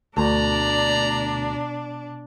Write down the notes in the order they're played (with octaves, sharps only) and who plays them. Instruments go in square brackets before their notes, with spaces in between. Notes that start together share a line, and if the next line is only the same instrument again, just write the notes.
[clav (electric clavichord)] D2 [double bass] B2 [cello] D4 [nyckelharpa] D5 A#5